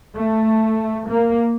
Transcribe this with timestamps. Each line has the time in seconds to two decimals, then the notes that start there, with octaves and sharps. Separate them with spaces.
0.15 A3
1.07 A#3